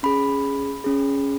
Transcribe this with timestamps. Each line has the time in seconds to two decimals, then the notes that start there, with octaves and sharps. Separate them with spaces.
0.03 C#4 G#4 B5
0.84 C#4 G#4